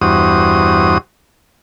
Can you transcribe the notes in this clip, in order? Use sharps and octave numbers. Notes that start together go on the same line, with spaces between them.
E2 G2 F#4 C5 D#6